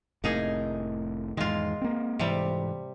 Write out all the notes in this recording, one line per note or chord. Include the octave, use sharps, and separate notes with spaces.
F1 A2 C3 A#3 D#4 G#4
E2 G#2 D#3 G#3 F4
A#3 C4
G#2 C3 E3 G3